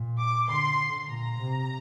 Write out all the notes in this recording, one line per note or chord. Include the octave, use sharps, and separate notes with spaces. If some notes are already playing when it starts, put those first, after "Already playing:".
Already playing: A#2
D6
D3 C6
A#2 A#5
C3